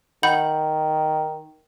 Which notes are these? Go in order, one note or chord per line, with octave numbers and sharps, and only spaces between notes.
D#3 F#5 B5 G6